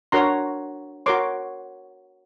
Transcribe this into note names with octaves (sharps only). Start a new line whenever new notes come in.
D4 F#4 A#4 C#5 A#5 C6
F#4 A#4 C#5 C6 D6